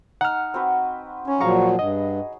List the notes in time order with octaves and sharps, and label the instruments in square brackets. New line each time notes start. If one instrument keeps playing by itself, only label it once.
[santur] D#4 [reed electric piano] F#5 F6
[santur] C4 F#4 B4
[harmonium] C#4 [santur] C#5
[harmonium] A#2 F3 F#3 [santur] G#4 F#5 [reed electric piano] F5 A#5 C#6
[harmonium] G2 [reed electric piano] D#5